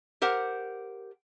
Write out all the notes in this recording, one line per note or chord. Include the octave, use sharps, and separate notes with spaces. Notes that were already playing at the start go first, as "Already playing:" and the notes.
G4 A#4 C5 F#5